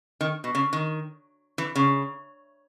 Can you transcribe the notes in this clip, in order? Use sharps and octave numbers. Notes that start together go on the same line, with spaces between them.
D#3
B2
C#3
D#3
E3
C#3